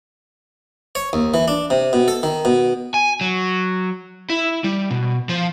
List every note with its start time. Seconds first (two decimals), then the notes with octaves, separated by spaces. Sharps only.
0.95 C#5
1.13 D#2
1.34 E3
1.48 D4
1.70 C3
1.93 B2
2.08 A4
2.23 D#3
2.45 B2
2.94 G#5
3.21 F#3
4.30 E4
4.64 G3
4.91 B2
5.29 F3